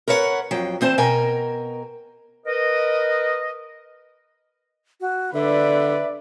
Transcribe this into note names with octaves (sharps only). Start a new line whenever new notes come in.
A#4 B4 C#5 D#5 F#5
F2 F#3 G5
E2 C4 C5 A5
B2 A#4 G5 G#5
A#4 B4 D#5
F#4
D3 B4 D5 E5